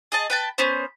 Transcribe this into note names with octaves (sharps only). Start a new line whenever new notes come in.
G#4 D#5 A5
B4 G5 A5
B3 C#4 C5